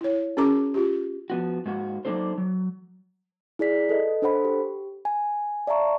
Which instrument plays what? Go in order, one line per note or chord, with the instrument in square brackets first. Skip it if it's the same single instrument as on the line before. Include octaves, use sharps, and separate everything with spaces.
[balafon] E4 C#5
C#4 F#4 G#4 A#4 A#5 D6
F4 G4
[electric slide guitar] F3 B3 F#4
G#2 A#3 F#4
F#3 A#3 D4 D#4 A4 C5
F#3
[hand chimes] E4 G#4 D5 B6
A4 B4 D#5
D4 A4 C5 F#5 B5
G4
G#5
D5 E5 F5 A5 A#5 C#6